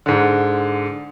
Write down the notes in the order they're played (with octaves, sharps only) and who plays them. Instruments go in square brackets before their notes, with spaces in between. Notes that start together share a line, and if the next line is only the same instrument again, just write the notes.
[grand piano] G#2 D3